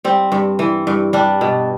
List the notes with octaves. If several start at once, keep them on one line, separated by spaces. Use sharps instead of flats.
G3 C4
G2
E3
G2
G3 D4
B2